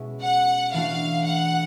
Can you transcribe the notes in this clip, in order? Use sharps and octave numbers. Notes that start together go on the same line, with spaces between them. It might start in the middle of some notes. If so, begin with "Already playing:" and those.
Already playing: B2 G#3 C#4 E4
F#5
E3 A3 D4 F#4 F5
F#5